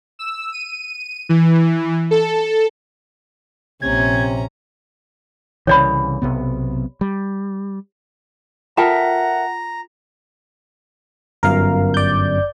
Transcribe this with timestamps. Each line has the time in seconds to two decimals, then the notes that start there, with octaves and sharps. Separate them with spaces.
0.19 E6
0.52 D#7
1.29 E3
2.11 A4
3.82 A#1 C3 C#4 A#5 G#6
5.67 C2 C#3 E3 C#5 D5 B5
6.22 B1 C3 B3
7.01 G3
8.77 F4 A4 A#4 E5 F#5 G5 A5 A#5
11.43 G1 F#2 A#4 F5
11.94 D5 G6